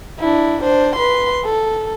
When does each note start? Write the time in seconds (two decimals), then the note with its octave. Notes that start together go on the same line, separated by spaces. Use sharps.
0.19 D4 E4
0.62 D4 C5
0.95 B4 C6
1.45 A4